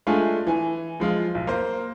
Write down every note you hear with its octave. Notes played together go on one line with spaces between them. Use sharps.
G#3 A3 D4 F4 G#5
E3 G#5
F3 G#3 F4
B1
A#3 C5